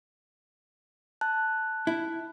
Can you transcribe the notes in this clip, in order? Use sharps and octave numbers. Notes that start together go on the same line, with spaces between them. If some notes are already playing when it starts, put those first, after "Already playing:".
A5 F#6
E4